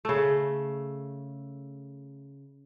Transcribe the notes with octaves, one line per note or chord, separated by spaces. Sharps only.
C#3 A3